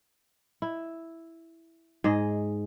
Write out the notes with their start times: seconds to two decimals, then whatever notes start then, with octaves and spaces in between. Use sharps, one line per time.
0.62 E4
2.04 G#2 G#4 D#5